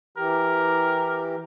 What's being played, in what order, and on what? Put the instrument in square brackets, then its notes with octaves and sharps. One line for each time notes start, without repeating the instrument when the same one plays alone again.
[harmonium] E3 G4 [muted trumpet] A#4